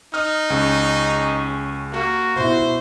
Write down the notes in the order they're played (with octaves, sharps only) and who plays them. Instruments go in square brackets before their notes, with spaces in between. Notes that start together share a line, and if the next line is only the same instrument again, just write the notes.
[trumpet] D#4 [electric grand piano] D#6 F6
[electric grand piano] C#2 [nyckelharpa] C#4 G#4
[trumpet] A#3 [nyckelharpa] F#4
[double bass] B2 E4 [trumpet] C5